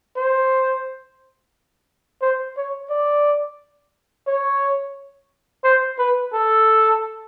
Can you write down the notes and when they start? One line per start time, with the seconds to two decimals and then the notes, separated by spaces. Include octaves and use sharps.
0.17 C5
2.22 C5
2.57 C#5
2.90 D5
4.27 C#5
5.64 C5
5.99 B4
6.34 A4